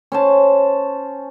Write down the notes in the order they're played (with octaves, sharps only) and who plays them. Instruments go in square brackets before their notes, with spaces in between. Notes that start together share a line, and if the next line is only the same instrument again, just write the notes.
[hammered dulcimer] C#4 C5 A5